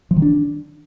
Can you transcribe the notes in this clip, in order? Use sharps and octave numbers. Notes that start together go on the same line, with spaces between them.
F3
D#3
D4